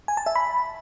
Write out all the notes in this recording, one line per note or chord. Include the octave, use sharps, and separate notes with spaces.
G#5
A5
E5
B5